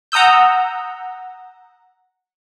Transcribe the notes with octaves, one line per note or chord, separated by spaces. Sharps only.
F#5 A#5 D#6 E6 G6